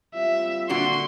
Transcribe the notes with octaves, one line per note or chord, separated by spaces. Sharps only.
G3 C4 F4 E5
A#2 D3 F#4 C6